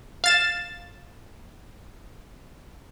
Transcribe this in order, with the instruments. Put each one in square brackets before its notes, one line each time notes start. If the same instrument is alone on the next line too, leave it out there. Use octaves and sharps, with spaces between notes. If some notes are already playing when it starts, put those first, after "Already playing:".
[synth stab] F5 A6 E7